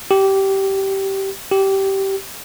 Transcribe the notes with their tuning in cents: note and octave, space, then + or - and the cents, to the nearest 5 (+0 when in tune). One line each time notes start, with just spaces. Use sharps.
G4 -15
G4 -15